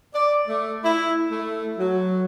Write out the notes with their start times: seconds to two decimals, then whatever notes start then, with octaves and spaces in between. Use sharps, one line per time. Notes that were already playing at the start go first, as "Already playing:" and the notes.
0.14 D5
0.48 A3
0.84 E4
1.31 A3
1.77 F#3